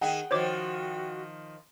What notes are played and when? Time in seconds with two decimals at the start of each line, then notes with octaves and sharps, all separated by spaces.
0.01 D#3 G#4 F#5 G5
0.31 D#3 F3 F#4 C5 C#5 D6